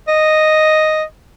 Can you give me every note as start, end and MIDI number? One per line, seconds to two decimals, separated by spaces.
0.08 1.03 75